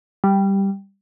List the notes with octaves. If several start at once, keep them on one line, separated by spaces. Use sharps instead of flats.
G3